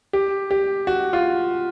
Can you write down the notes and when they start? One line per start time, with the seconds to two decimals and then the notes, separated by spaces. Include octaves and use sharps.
0.13 G4
0.51 G4
0.87 F#4
1.13 F4